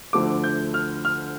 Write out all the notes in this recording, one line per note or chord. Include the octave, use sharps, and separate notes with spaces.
D2 D3 F3 A3 D6
G6
F6
F6